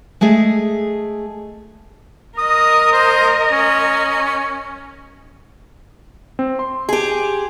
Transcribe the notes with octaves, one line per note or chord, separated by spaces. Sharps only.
G#3 A3 G#4 A4
A#4 D#5 D#6
C5
C#4
C4
C6
G4 G#4